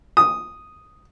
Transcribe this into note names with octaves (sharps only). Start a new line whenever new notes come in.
D#6